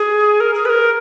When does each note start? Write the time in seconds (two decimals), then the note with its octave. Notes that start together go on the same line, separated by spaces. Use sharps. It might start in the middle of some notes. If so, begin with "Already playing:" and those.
Already playing: G#4
0.40 A#4
0.54 G#4
0.65 B4
0.69 A#4